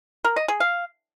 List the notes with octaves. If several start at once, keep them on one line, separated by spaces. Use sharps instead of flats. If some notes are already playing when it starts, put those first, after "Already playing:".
A#4
D#5
G#4
F5